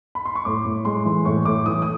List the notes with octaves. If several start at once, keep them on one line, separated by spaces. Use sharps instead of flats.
B5
C6
C#6
A2 D6
A2
G#3 C6
E3
A2 C#6
A2 D6
E3 D#6
D#6